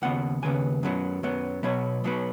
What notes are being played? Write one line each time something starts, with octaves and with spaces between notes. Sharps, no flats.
D#2 C#3 B3 F#5
D#2 C#3 B3 G#5
F#2 F#3 B3
F#2 F#3 B3
B1 B2 F#3 B3 C#5
B1 B2 F#3 B3